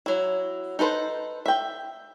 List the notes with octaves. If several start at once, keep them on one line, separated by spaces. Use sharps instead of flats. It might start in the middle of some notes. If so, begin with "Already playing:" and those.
F#3 E4
D#4 A4 B4 C5
E5 G5